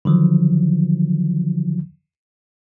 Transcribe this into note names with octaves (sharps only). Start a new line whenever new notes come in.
D3 D#3 F3 F#3